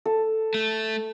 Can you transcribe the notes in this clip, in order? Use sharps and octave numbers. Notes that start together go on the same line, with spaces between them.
A4
A3